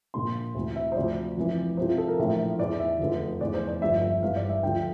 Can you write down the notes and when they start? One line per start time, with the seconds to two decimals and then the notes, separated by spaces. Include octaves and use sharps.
0.14 A#1 A#2 F3 C6
0.55 D2 C3 E3
0.76 E5
0.92 C5
0.96 D2 C3 F3 D5
1.37 F1 F2 E3
1.77 C2 C3 F3 C5
1.98 A4
2.08 A#4
2.19 A#1 A2 E3
2.59 E2 E3 D5
2.80 E5
2.99 F1 E2 D3 F3
3.41 F1 E2 E3 D5
3.54 C5
3.67 D5
3.81 G1 G2 D3 F3 E5
4.02 E5
4.22 G1 G2 E3 F5
4.36 D5
4.49 E5
4.63 D2 D3 F3 G5